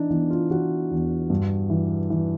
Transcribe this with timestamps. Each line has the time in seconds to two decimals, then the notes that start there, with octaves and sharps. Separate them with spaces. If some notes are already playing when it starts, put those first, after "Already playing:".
Already playing: E3 D4 D#4
0.10 E3 B3
0.30 F4
0.50 E3 F#4
0.91 E2
1.30 G2
1.70 E3
2.10 E3